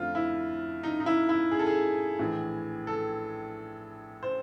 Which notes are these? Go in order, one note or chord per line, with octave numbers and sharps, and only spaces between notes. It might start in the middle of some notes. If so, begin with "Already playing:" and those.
Already playing: F2 D3 F3 A3 F4
E4
D#4
D#4
E4
E4
G#4
A4
G#4
A#1 A2 E3
A4
C5